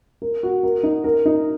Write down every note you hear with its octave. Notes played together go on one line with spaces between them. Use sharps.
A#4
F#4
A#4
D#4
A#4
D#4